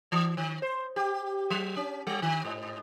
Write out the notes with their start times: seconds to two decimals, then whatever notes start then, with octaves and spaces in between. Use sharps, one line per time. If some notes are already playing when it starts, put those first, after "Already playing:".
0.12 E3
0.37 D#3
0.62 C5
0.96 G4
1.50 F#3
1.76 C#4
2.07 G3
2.22 D#3
2.45 G#2